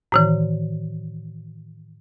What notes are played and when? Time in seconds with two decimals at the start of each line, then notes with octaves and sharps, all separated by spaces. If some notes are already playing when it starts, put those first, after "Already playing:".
0.12 A2 D#3 E3